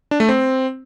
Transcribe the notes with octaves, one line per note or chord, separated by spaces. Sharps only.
D4
A3
C4